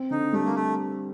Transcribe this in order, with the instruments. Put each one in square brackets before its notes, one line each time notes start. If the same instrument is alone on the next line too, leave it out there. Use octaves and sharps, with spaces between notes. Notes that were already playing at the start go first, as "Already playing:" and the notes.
Already playing: [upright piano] C4
[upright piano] D3 [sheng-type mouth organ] D#4
[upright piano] G3 [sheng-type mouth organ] A3
[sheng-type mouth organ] A#3
A3